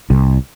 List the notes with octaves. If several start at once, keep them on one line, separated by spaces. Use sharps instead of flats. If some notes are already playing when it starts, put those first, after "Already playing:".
C2